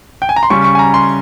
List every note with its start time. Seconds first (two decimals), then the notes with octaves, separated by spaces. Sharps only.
0.22 G5
0.29 G#5
0.36 A#5
0.43 C6
0.50 C#3 G3 C#4 C#6
0.64 C#6
0.75 G#5
0.79 A#5
0.94 C6